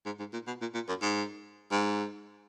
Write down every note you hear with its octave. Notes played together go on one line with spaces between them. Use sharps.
G#2
G#2
A#2
B2
A#2
A#2
F#2
G#2
G#2